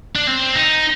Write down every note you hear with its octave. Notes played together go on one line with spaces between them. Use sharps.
D4
C4
D#4